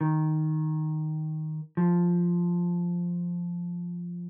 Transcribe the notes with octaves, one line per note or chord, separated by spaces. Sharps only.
D#3
F3